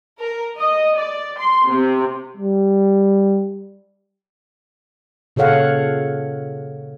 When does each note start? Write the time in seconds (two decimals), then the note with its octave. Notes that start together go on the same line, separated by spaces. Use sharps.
0.19 A#4
0.58 D#5
0.96 D5
1.39 C6
1.69 C3
2.37 G3
5.36 A#2 C#3 A4 C#5 F5 F#5